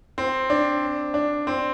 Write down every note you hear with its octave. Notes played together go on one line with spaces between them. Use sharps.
C4
D4
D4
C4